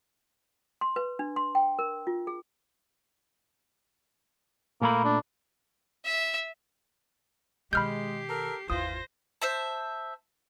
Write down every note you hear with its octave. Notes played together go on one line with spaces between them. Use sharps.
C6
B4
D4
C6
G5
A#4
F4
G#4
A#2 A3 A#3 B5
D4
E5
B2 D#3 G#3 G4 B5 F6 G6 C7
A4 A#4
G#1 E2 E3 F4 C5 D#6 A#6
C5 E5 A5